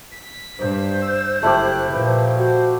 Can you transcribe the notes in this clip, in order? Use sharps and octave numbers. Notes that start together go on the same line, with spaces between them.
B6
G2 C5
E6
F#1 A3 E4 G4 F#6
A#2 F3 B4
F#4 C5